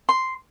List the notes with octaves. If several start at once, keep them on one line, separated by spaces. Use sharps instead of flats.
C6